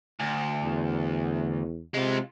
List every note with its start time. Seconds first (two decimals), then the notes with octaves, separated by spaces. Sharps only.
0.20 D2
0.63 E2
1.94 C3 G#3 F4